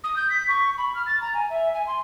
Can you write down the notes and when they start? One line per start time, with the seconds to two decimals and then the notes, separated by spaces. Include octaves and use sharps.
0.04 D#6
0.16 G6
0.30 B6
0.48 C#6
0.78 B5
0.95 F6
1.06 A6
1.21 A#5
1.34 G#5
1.50 E5
1.74 G#5
1.87 C6